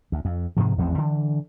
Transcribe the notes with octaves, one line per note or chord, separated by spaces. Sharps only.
D2
F2
G#2 C3 D#3 F3
A1 E2 F3 C4
D3 E3